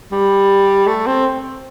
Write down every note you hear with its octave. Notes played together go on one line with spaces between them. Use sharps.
G3
A3
C4